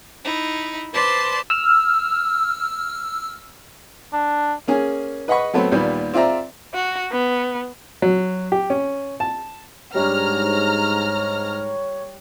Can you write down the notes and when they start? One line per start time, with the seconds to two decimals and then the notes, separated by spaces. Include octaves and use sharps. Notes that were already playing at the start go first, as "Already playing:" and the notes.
0.25 D#4 E4
0.94 B4 C5 D5 A5 C6
1.50 E6 F6
4.13 D4
4.68 A#3 C#4 G#4
5.28 B4 D#5 F#5 B5 C#6
5.54 F#3 A3 B3 C4
5.72 D#2 A#2 G3 B3 D5
6.14 C4 F4 D5 E5 A#5
6.74 F#4
7.12 B3
8.02 F#3
8.52 G4
8.70 C#4
9.20 A5
9.94 G#2 G3 D4 C#5 A#5 F6